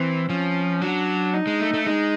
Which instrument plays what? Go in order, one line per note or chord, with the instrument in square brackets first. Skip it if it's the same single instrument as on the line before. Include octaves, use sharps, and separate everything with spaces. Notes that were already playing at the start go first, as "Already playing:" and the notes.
Already playing: [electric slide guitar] E3 [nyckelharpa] C4
[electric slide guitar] F3 [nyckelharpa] C#4
[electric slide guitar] F#3 [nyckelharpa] D4
[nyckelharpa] D#4
[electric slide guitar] G#3
A3
A3
[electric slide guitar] G#3 [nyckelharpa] D#4